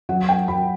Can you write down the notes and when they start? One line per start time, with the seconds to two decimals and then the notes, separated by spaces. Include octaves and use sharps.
0.09 F#3 F#5
0.29 G5
0.48 F#3 B5